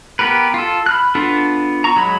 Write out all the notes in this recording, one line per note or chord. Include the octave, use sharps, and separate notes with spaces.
B3 G4 A#4 B4
F4 A4
B5 F6 F#6
B3 D4 F4 A4
A#5 C#6
F#3 G#3 B5